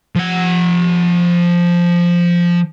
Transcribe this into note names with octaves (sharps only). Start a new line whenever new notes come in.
F3 F#5